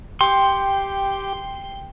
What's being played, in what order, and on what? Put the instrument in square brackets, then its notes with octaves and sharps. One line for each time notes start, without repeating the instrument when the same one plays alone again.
[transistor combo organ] G4 [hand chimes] G5 [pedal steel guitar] C6